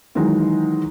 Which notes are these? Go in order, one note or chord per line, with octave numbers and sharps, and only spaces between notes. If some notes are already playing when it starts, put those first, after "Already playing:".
D#3 E3 F#3 G#3